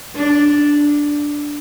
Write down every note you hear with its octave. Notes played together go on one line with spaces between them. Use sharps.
D4